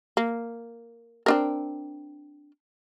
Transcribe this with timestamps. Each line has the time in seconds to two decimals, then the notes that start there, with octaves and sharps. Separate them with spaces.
0.17 A#3
1.26 C4 D4 A#4